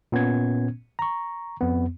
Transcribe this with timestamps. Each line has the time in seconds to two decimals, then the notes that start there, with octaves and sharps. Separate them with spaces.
0.12 A#2 B3 C#4 G#6
0.99 A#5 C#6
1.61 F2 B3